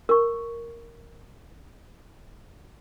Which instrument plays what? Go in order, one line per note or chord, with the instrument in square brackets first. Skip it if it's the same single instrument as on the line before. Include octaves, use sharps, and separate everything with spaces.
[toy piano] A#4 C#6